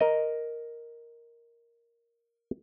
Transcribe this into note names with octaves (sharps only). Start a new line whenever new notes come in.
A#4 D#5